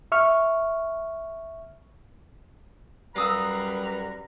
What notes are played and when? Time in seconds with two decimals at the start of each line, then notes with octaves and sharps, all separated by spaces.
0.12 E5 C#6 F6
3.16 F#2 G3 B4 F5 A#5 D#6 E6